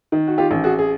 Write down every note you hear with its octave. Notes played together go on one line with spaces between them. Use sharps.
D#3
F#4
F4 G4
A1
F#4 G#4
G#4